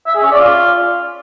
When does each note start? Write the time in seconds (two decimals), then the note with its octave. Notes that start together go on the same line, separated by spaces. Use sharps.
0.07 E5
0.15 G#4
0.23 C#4
0.31 D5
0.39 F4